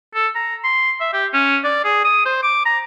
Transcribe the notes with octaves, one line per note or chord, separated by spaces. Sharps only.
A4
A#5
C6
E5
G4
C#4
D5
G#4
D#6
C5
D6
A#5